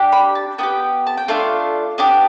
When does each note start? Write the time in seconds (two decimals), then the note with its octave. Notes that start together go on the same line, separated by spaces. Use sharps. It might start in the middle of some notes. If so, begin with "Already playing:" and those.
Already playing: D4 G4
0.12 B5
0.35 A5
0.58 B3 E4 G5
0.63 G4
1.07 A5
1.17 G5
1.28 A3 D4 F4 F5
1.98 B3 D4 G4